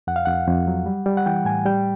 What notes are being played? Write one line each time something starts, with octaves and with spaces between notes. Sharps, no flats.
F2 F#5
F5
F2 F#5
F2
F#3
G3
G3
F#5
E3 G5
A2 G#5
G3 G5